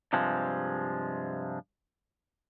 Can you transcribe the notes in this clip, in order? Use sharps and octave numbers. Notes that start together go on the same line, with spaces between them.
G2 C3 F3 G#3